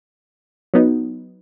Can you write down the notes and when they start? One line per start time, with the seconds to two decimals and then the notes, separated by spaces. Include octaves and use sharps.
0.74 F#3 B3 D#4